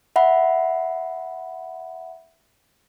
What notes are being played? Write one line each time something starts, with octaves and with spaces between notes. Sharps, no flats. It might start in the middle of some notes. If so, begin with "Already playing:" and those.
E5 F#5 B5